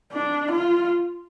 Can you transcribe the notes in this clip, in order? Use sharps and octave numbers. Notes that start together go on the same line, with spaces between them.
D4
F4